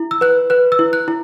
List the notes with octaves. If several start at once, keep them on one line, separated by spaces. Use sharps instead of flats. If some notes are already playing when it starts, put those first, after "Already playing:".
Already playing: E4
E6
B4 F#6
B4 F#6
E6
E4
F#6
E4